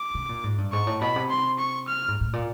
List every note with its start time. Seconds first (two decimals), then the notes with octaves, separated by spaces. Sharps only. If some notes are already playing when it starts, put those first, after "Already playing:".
Already playing: D6
0.15 C3
0.29 A#2
0.43 G#2
0.58 G2
0.72 G#2 C#6
0.87 A2
1.01 B2 B5
1.16 C3
1.30 C6
1.59 C#6
1.88 F6
2.08 G#2
2.21 A2
2.33 A#2